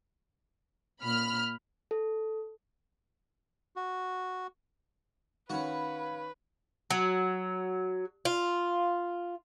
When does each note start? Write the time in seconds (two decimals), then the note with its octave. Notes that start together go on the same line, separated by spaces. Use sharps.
1.02 A#2 B5 F6
1.91 A4
3.76 F#4
5.50 D#3 C#4 F#4 B4 F5 F#5 B5
6.90 F#3
8.25 F4